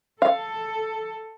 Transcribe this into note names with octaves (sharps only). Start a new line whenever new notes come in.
A4 F5